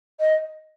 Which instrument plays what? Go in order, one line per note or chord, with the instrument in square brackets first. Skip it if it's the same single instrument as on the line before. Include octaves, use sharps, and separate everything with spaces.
[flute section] D#5